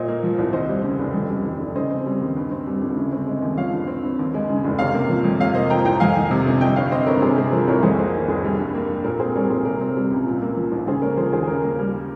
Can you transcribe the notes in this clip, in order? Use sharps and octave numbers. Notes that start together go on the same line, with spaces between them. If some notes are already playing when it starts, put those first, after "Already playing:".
Already playing: A#2 C5 D#5
A#3
F3
C2
D#2 C5 D#5
G3
C#3
F1
F2
G3
D#3
F1
C#3 C5 D#5
C4
G3
D#2
G2
C4
G3
G1
C#3
C4
G#3
D#2
F3 C#5 F5
G2
C4
G2
D#2
G#3
C#3
F1
C3 C#5 F5
A#3
F3
F2
C3 C#5 F5
A#3 C5 D#5
F3 G5 A#5
C2 G5 A#5
F2 F5 G#5
D#3
C3
G1
G3 D#5 G5
G2 C#5 F5
C4 C5 D#5
G2 A#4 C#5
C3 G#4 C5
C4 G#4
F3 A#4
C2 A#4 C#5
F2 G#4 C5
A#3 G#4 C5
D#3
F1 G#4
G3
G2
A#3
G2
A#2 A#4
C4 G#4 C5
G3 A#4 C#5
A#1 G#4 C5
C3 A#4
C4
G3
C#2
A#2
A#3
F3
A#1
C#3 G#4 C5
A#3 A#4 C#5
F3 G#4 C5
D#2 G#4 C5
G#4
C#3 A#4
A#3
G3